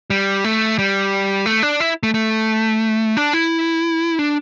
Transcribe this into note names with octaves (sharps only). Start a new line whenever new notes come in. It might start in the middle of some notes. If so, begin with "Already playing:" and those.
G3
A3
G3
A3
D4
E4
A3
A3
D4
E4
D4